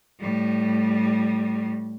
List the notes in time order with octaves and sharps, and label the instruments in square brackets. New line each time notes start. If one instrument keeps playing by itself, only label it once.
[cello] A2 G3